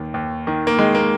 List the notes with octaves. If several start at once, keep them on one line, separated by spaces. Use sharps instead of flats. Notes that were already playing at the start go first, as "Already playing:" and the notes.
Already playing: D#2 D#3
D#2
D#3
A#3
D#3 G#3
A#3